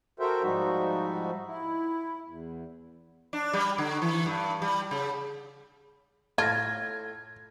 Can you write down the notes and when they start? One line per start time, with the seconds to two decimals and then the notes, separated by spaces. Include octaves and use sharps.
0.20 F#4 A4 A#4 C5 E5 G5
0.43 G#2 F3 G3 D#4 F#4 E5
1.47 E4
2.28 E2
3.33 D4
3.53 G3
3.78 D3
4.02 E3
4.26 G2
4.62 G3
4.91 C#3
6.38 A2 F4 A5 F6 G#6 A#6